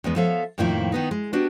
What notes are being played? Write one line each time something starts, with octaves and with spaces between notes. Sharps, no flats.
E2 G#3 B3
F3 B3 A4 C#5 E5 F5
F2 A2 D#3 F3 A#3 E4
D#3 B3 D#4
G#3
B3 D4 F#4 G4